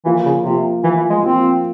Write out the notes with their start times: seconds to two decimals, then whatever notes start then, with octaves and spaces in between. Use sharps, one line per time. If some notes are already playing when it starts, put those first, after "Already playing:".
0.05 E3 F3 A#3 F4
0.25 C#3
0.45 C3 F3 A#3 F4
0.83 E3 F3 A#3 F4
0.97 E3
1.10 G#3
1.22 F3 A#3 C4 F4